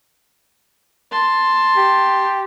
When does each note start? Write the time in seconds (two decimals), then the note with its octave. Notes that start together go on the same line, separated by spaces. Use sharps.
1.11 A5 C6
1.77 G4